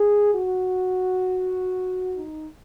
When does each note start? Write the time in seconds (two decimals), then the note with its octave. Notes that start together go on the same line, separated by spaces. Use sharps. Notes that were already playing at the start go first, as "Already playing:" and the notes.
Already playing: G#4
0.34 F#4
2.16 D#4